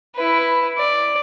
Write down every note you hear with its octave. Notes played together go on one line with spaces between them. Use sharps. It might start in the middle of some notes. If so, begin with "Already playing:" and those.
E4 B4
D5